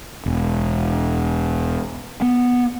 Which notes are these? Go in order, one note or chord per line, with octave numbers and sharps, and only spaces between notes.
E1
B3